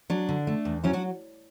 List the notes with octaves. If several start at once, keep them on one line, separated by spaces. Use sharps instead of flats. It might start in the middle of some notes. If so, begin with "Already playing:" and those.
F#3 D4
D3
A3
E2
F#3 C#4 E4
D4 F#4